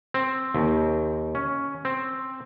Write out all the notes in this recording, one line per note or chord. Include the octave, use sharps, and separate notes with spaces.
C4
D#2
C#4
C4